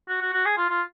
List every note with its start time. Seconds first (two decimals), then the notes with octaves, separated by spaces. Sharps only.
0.09 F#4
0.22 F#4
0.33 F#4
0.46 G#4
0.57 F4
0.70 F4